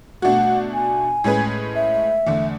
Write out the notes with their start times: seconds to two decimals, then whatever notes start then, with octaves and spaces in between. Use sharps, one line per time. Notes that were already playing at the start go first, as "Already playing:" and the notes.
0.22 B2 A3 D4 F#4 F#5
0.74 G#5
1.24 A2 G#3 C#4 G#4 B4
1.75 E5
2.27 E2 D3 A3